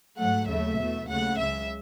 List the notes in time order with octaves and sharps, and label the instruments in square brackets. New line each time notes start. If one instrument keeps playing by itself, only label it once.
[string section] G#2 F#3 A3 F#5
D#2 C#3 F#3 A3 E5
E2 B2 A3
D#2 C#3 F#3 A3 F#5
C#2 C#3 G#3 E5